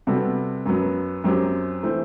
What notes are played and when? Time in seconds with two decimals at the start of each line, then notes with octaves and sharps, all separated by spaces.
0.07 C3 G3 B3 F#4 A4
0.66 F#2 F#3 B3
1.24 F#2 F#3 C4 G4
1.83 E3 A3 C4